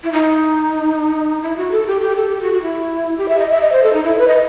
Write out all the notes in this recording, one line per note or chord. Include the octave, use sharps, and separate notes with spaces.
E4
D#4
E4
F#4
A4
G4
G4
A4
G4
F#4
F#4
E4
G4
E5
D#5
E5
D#5
C5
A4
D#4
E4
B4
D#5